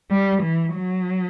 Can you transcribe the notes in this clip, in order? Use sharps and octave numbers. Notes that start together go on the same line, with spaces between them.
G3
E3
F#3